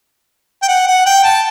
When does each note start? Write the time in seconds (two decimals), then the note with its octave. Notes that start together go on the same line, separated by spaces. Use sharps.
0.63 G5
0.68 F#5
0.87 F#5
1.06 G5
1.24 A5